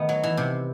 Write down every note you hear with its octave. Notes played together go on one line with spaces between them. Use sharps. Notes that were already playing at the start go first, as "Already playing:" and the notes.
Already playing: D#3 A3 B3
F#3
E3
C3